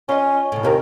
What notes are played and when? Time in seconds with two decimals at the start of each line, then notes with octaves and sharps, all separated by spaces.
0.09 C#4 F4 D#5
0.52 A2 C#3
0.63 D#2 C3 D#3 A#4